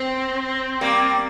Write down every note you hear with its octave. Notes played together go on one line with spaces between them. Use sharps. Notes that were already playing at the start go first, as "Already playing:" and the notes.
Already playing: C4
G3 A#3